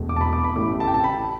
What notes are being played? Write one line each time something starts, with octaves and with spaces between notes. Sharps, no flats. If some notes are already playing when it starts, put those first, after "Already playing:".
Already playing: E1 E2 B2 A3
D6
A5
B5
D6
B5
A1 A2 A3 D6
A5
G5
A5
B5